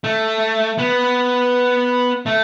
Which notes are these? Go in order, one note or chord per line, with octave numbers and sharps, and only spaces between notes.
A3
B3
A3